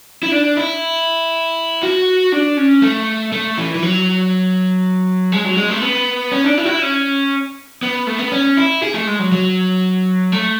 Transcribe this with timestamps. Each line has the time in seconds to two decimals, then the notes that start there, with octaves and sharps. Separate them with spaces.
0.23 E4
0.32 D4
0.57 E4
1.83 F#4
2.32 D4
2.57 C#4
2.82 A3
3.32 A3
3.58 E3
3.75 E3
3.82 F#3
5.32 G#3
5.44 F#3
5.57 G#3
5.70 A3
5.81 B3
6.32 C#4
6.44 D4
6.58 E4
6.65 F#4
6.69 E4
6.82 C#4
7.83 B3
8.07 A3
8.19 B3
8.32 C#4
8.57 E4
8.83 G#4
8.94 A3
9.07 G#3
9.19 F#3
9.32 F#3
10.32 A3